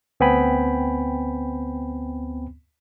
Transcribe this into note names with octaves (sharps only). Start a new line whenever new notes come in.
D2 B3 C4 G5 G#5 B5